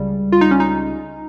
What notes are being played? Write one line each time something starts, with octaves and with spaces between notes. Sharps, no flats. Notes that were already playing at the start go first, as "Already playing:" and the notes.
Already playing: C#2 C#3 G3
F4
D#4
C#4
D#4